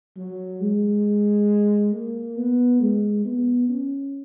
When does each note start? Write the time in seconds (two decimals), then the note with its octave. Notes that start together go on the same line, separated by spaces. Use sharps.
0.17 F#3
0.61 G#3
1.93 A#3
2.36 B3
2.80 G#3
3.25 B3
3.68 C#4